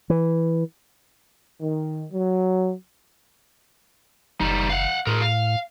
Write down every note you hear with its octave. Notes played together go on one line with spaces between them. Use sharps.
E3
D#3
F#3
F#1 G3 D#4
F5 F#5
A2 G#4 A#4
F5